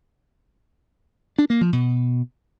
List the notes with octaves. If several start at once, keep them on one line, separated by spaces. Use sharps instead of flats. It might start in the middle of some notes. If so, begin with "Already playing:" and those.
D4
A#3
F3
B2